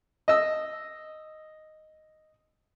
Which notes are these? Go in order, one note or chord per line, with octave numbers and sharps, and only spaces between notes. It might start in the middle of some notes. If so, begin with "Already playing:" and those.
D#5 E6